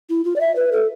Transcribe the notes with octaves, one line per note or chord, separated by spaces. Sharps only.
E4
F4
D5
E5
B4
A4